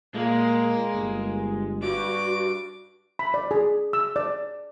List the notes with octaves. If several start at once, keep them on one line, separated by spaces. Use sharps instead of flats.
A#2 G#3 A#3
G1
G2 F#4 D6
B5
D5
G#4
E6
D5